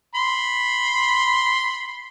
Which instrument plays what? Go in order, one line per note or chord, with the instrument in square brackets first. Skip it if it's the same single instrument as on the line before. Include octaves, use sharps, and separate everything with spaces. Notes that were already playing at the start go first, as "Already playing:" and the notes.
[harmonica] B5 C6